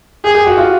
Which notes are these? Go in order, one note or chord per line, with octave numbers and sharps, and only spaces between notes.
G4 G#4
G4
F#4
F4